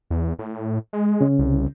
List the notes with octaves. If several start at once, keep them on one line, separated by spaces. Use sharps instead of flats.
E2
A2
G#3
C#3 C#4
C2